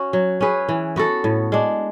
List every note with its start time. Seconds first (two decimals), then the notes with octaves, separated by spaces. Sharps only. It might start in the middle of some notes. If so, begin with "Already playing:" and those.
Already playing: C#4 F#4
0.13 F#3
0.41 C#4 G#4 B4
0.69 E3
0.96 B3 F#4 A4
1.24 A2
1.52 G#3 D4